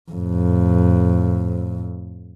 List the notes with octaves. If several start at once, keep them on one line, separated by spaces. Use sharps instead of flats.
F2 A2